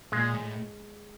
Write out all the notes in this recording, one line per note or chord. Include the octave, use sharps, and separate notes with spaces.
A#2 G#3
A2